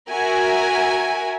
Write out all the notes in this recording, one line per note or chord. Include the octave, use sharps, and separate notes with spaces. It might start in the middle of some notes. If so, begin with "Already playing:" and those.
F#4 A#4 E5 G#5